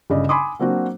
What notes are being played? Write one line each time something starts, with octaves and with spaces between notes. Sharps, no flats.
G1 C#3 D5 D#5
G#5 B5 C6 D6 D#6
F#3 A#3 C4 D4 F#4